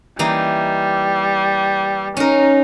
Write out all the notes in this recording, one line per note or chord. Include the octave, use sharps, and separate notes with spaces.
E3 G3 A#3 D#4
C#4 D#4 A#4